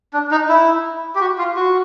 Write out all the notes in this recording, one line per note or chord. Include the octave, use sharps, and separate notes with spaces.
D4
D#4
E4
G4
F#4
F4
F#4